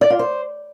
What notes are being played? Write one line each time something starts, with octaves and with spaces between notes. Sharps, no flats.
D5
F4
C5